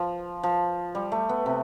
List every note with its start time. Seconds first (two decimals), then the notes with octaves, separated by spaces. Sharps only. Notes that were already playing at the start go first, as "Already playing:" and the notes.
Already playing: F3
0.43 F3
0.95 G3
1.12 A3
1.29 B3
1.46 C3